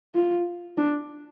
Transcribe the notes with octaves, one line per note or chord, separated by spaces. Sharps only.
F4
D4